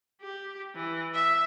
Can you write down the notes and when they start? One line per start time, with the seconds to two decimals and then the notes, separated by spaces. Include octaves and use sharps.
0.22 G4
0.75 E3
1.14 E5